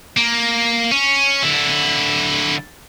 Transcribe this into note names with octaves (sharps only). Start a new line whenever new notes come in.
A#3
C#4
D3 E4